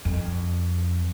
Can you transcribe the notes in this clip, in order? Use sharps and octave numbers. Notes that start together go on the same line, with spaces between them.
F2